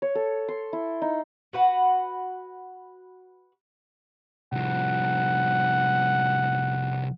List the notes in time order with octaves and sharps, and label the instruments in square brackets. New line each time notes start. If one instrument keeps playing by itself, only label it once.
[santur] C#5
A4
C6
E4
D#4
[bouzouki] F#4 B4 F#5
[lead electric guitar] C2 F3 [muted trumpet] F#5